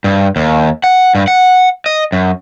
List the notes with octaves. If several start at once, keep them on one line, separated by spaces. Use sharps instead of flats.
G2
D#2
F#5
G2
F#5
D#5
F#2